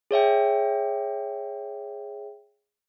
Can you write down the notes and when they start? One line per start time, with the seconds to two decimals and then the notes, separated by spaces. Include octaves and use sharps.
0.11 G#4 C#5 E5 G5